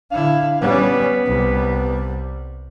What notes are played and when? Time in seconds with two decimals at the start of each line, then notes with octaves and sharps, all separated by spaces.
0.11 D3 E4 F5
0.61 G3 B3 C#4
1.26 C2 G3